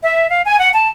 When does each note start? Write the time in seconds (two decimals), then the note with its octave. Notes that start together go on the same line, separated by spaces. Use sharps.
0.01 E5
0.29 F5
0.45 G#5
0.59 F#5
0.73 A5